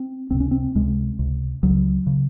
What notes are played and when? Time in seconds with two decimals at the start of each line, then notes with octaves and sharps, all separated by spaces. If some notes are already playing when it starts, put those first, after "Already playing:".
Already playing: C4
0.31 C#2 C3 C4
0.40 C#4
0.51 C4
0.75 C#2 C3 G#3
1.19 C#2 C3
1.63 C#2 C#3 F#3
2.07 C#3